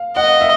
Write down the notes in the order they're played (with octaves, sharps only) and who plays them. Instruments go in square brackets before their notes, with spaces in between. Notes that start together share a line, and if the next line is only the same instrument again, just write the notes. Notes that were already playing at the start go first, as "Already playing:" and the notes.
Already playing: [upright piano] F5
[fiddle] D#5 [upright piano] F#5
[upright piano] E5